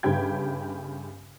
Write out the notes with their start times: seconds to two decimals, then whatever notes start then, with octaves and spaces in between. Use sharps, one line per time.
0.03 G1 G2 C#3 G4 G5 G#6